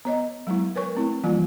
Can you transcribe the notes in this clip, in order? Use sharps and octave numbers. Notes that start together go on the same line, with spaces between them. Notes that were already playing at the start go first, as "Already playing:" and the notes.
B3 C#5 D#5
F#3 G#3 B3 E4
A#4 B4 C#5 C#6
A3 C4 E4
E3 F3 G3 A#3 F4